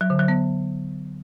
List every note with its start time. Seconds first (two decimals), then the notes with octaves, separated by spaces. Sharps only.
0.01 F#3
0.10 D3
0.19 F#3
0.28 B3